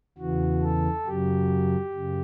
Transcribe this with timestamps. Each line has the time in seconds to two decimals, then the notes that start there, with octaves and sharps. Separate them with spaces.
0.18 E2 C#3 E3 F#4
0.62 A4
1.06 F#2 C#3 F#3 G4
1.93 F#2 C#3